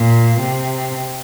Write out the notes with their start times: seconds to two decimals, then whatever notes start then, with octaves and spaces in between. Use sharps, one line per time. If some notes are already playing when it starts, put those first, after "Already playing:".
Already playing: A#2
0.40 C3